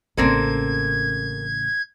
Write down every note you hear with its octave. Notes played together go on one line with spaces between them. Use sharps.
A1 C#3 A#3 C4 A4 G#6